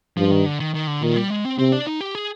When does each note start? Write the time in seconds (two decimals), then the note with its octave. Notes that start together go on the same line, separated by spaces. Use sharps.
0.17 G2 F3
0.31 D#3
0.46 D3
0.60 D#3
0.74 D#3
0.87 D3
1.02 A#2 D#3
1.16 G3
1.30 G#3
1.45 C4
1.58 C3 C4
1.72 D4
1.87 D#4
2.01 G4
2.15 G#4